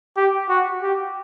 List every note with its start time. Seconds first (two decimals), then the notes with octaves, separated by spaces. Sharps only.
0.17 G4
0.49 F#4
0.82 G4